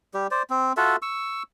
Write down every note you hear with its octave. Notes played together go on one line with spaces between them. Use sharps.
G3 G4
C5 D5
C4
F4 F#4 A4 E5
C#6 E6